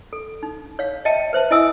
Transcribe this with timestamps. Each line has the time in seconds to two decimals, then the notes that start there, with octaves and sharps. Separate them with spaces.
0.13 A4
0.43 D#4
0.79 C#5 F5
1.05 D#5 E5 G5 A5
1.33 B4 C5 E5 A5
1.51 E4 D#5 E5 G#5 D#6 E6